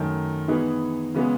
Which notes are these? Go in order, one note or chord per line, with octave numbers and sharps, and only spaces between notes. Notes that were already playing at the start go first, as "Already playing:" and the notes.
Already playing: F#2 D#3 F#3 A3
E3 B3 D#4 G#4 B4
C#3 E3 G#3 B3